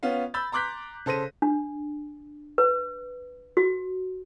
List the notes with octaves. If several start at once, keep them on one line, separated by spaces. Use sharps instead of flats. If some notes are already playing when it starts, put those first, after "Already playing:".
B3 C#4 F4 F5
B5 E6 G6 A6
A#5 C6 D6 F#6 G6 B6
C#3 A4 C5 A#6 D#7
D4
B4
F#4